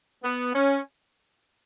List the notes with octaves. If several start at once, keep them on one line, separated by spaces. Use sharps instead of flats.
B3
C#4